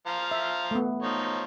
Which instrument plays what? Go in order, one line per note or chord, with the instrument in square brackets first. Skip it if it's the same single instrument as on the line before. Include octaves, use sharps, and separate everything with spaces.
[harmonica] F3 F5 A#5
[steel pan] E5
A3 B3
[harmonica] F3 D#4 C#5